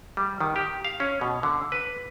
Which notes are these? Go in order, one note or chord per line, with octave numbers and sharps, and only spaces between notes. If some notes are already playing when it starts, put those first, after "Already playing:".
G3
D#3
G4
F5
C#4
B2
D3
B4